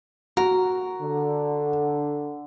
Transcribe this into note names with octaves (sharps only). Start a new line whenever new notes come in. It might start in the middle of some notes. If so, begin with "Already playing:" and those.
F#4 A#4
D3